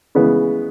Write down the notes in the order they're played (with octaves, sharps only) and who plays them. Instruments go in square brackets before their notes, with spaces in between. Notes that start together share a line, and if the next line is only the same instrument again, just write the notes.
[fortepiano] C#3 E3 G#3 B3